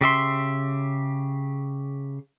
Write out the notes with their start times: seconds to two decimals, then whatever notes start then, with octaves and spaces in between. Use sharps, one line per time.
0.01 C#3 G4 E5 C6